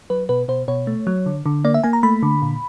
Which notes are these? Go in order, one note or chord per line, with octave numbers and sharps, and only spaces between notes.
F#3 B4
B2 B4
B2 C5
B2 C#5
A3
F#3
D3
D3
A#3 D5
E5
A#3 G#5
A#5
A3 B5
D3
A#2